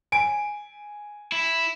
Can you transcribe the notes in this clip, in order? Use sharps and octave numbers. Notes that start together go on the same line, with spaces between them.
G#5 D7
E4